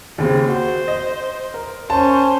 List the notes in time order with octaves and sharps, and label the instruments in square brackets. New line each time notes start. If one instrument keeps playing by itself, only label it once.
[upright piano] D#2 C#3 C4
[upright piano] F#4 [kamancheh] C5
[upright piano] D#5
A#4
[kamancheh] C#4 C5 [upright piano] A5